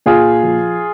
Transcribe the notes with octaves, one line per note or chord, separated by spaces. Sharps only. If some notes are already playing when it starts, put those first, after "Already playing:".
A#2 F4 G#4
F3